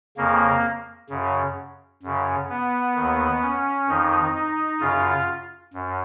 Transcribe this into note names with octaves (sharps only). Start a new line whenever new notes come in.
F2 C#3 A#3
F#2 C#3
F#2 C#3
B3
D#2 D#3
C#4
F2 D#3 D#4
D#4
F#2 C#3 F4
F#2